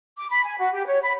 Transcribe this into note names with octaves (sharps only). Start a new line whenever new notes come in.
D6
B5
G#5
F#4
G4
C#5
B5